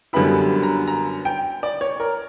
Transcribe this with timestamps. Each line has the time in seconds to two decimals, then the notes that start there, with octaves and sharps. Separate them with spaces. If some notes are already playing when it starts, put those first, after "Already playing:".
0.13 F#2 D3 G3 B3 E4 B5
0.39 B5
0.63 A#5
0.87 A#5
1.25 G5
1.63 D5
1.81 C#5
2.00 A#4